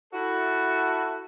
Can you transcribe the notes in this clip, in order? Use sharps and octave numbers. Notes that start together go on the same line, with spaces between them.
E4 F#4 A4